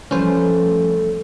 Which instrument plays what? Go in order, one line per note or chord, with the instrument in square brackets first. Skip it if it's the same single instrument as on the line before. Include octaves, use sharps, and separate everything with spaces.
[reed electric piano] E3 F3 G3 [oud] A3 B4 [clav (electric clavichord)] C#4 C5